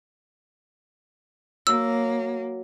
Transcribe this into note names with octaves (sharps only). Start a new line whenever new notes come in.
F#3 A#3 E6